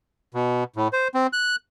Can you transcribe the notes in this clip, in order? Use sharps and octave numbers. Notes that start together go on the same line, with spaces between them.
B2
A2
C5
C4
F#6